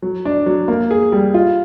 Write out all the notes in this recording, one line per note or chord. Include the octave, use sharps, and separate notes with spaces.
F#3
D4
F#3
A#3
G#4
G3
F4